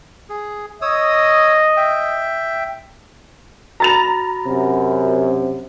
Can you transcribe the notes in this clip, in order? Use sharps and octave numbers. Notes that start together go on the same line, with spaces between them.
G#4
C#5 D#5 D#6 E6
E5 G5
F#4 A#5 B5 A6 F7
F#2 C3